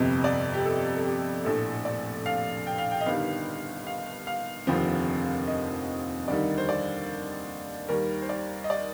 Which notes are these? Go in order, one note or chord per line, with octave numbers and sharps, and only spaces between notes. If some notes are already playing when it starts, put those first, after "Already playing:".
Already playing: G1 F2 C3 D#5
D5
G4
A4
A4
G4
A#1 A2 A3 D4 A4
D5
F5
G5
F5
G5
D#5
G1 G2 D#3 G3 F5
F5
F5
F1 D#2 D3 F3 C4
D#5
D#2 D3 G3 A#3 D#4 D5
C5
D5
D#2 D#3 G3 A#4
C5
D5
D#5
D5